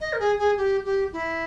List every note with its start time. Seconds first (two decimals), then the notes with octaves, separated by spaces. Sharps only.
0.01 D#5
0.13 A#4
0.19 G#4
0.39 G#4
0.57 G4
0.85 G4
1.13 E4